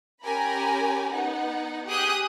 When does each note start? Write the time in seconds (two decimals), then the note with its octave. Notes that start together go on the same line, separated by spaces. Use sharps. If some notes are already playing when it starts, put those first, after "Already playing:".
0.22 C#4 G4 A#4 G#5 A#5 B5
1.12 B3 D#4 F#5
1.87 G4 G#4 D#6 F#6 G6